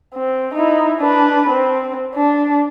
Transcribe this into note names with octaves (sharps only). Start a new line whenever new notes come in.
C4
D#4 E4
D4 B4
C4
D4